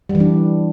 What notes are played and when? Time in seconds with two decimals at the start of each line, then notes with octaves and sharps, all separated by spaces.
0.09 G3
0.15 E3
0.20 D4